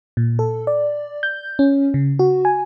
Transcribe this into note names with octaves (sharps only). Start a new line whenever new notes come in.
A#2
A4
D5
G6
C#4
C#3
F#4
G#5